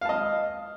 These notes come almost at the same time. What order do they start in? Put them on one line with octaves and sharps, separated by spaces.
F5 A5 D#5